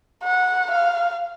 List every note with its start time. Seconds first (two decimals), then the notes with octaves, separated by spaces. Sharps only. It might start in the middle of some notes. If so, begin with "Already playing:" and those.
0.24 F#5
0.71 F5